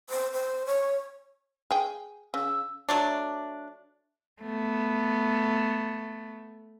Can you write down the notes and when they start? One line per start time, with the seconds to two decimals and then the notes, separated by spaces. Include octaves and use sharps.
0.10 C5
0.33 C5
0.66 C#5
1.71 G#4 G5
2.34 C#3 E6
2.89 F#3 A3 D4
4.42 A3 B3